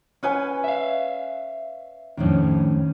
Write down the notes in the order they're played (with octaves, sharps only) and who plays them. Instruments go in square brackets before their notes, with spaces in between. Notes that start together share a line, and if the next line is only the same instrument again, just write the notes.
[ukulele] C#4 B4 G#5
[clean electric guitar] E5 F5
[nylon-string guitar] F2 A2 D4 [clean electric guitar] D#3 C#4